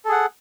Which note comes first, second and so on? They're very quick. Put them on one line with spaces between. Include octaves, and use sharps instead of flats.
A4 G#4 F#5